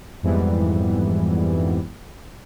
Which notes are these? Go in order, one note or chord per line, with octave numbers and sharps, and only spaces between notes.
F2 G#2 E3 G3 B3